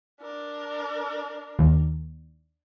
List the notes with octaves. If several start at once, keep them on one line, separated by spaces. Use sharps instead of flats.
D4 A#4
D#2